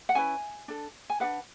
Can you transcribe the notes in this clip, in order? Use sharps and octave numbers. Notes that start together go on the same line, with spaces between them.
F#5
C#4 E4 B4 G#5
D4 A4
G#5
D4 G#4 B4 F#5